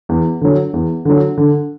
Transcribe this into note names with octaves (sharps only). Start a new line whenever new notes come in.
E2
D3 F#3
E2
D3 F#3
D3